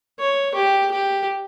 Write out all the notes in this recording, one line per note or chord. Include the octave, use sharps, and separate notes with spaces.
C#5
G4
G4